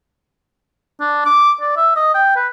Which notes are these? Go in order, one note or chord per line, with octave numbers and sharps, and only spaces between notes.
D4
D6
D5
E5
D#5
G5
B4